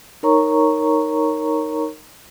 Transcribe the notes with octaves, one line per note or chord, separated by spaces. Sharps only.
D#4 A#4 C#5 A#5 C#6